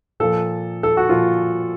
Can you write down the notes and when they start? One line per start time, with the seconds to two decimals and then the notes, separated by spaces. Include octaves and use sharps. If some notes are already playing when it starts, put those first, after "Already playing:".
0.20 A#2 F3 A4
0.83 A4
0.97 F#4
1.09 A#2 F3 F4